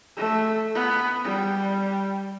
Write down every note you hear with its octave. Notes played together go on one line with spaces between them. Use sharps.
A3
B3
G3